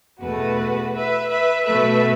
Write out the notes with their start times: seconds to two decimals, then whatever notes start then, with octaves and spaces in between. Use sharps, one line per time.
0.21 E2 B2 A3 F#4 B4
0.94 B4 E5
1.30 B4 E5
1.66 B2 A3 B4 E5